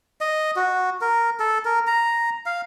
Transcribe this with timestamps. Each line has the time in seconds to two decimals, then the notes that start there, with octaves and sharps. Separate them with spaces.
0.21 D#5
0.56 F#4
1.01 A#4
1.40 A4
1.65 A#4
1.87 A#5
2.46 F5